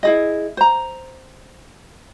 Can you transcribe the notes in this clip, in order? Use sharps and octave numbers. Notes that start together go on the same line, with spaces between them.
E4 G#4 D#5
C5 A#5